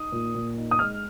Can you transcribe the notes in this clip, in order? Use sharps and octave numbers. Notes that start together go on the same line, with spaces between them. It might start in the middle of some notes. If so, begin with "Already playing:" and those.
Already playing: D#4 D#6
A#2
A#2
D#4
D#6
G#3 F6